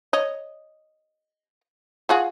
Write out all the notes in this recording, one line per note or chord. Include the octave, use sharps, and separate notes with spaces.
C#5 D#5
F4 F#4 G#4